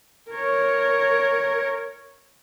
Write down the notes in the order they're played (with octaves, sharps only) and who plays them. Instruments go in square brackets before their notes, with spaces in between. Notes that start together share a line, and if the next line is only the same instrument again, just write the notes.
[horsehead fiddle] A#4 C#5